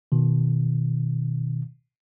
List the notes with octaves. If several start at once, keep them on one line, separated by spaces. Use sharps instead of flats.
B2 D#3